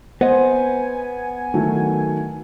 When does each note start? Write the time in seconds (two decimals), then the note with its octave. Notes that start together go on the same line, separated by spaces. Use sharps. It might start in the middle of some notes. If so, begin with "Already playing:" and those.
0.21 B3 C5 D#5 G#5
1.54 D#3 F#3 A3